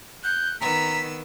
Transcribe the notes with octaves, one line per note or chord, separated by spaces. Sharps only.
F#6 G6
D#3 B3 A#5 E6 B6